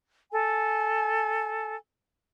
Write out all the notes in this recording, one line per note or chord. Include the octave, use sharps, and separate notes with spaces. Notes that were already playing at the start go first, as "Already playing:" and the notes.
A4 G#5